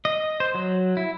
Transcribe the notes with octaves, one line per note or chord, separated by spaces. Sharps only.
D#5
C5
F#3
E4